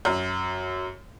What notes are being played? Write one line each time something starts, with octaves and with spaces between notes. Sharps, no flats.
F#2